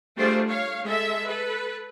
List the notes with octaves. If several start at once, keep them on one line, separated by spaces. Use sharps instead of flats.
G3 A3 D4 F4 G#4 C5
C#5 F5
G#3 A4 E5
A4 B4